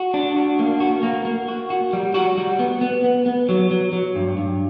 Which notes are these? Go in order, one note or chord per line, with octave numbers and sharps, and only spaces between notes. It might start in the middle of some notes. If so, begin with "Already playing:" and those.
Already playing: F#4
D4
F#4
A#3
F#4
A#3
A#3
F#4
F#4
G3
F#4
G3
B3
B3
B3
B3
F#3
F#3
F#3
G2
G2